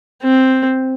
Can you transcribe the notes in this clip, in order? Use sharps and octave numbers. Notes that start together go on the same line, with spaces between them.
C4